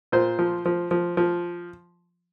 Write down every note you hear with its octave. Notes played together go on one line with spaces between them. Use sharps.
A#2 C5
F3
F3
F3
F3